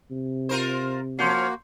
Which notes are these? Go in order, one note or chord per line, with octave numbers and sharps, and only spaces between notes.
C3
F4 A#4 C5
F3 A#3 C#4 F#4 C6 G6 C7